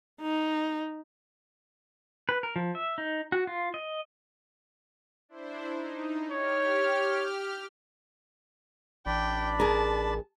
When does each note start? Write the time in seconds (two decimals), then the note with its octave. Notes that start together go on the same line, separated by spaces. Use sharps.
0.22 D#4
2.29 B4
2.43 A#4
2.56 F3
2.75 E5
2.98 D#4
3.32 F#4
3.47 F4
3.74 D#5
5.29 D4 E4 C5
5.73 D#4
6.31 G4 C#5 F6
9.06 A1 D4 D5 G5 B5
9.60 G#4 A#4 A5